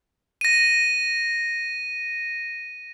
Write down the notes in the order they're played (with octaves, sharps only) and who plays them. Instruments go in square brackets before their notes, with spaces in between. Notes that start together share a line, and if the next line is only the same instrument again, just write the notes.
[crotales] A#6 D#7